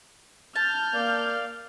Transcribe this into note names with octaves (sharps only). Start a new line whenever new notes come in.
A5 F6 G6
A#3 D5 F5